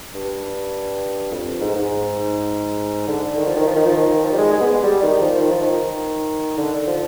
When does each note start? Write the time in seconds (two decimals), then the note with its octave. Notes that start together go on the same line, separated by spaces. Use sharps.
0.15 G2
1.32 F2
1.61 G#2
1.76 G#2
3.08 D3
3.37 D#3
3.46 F3
3.56 D#3
3.67 F3
3.76 D#3
3.86 F3
3.97 D#3
4.24 F3
4.33 G3
4.38 G#3
4.53 G#3
4.61 B3
4.68 G#3
4.83 G3
5.03 D#3
5.21 F3
5.41 D#3
5.51 F3
5.62 D#3
6.58 D3
6.87 F3